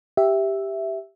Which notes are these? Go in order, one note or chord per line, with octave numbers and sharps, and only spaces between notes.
G4 E5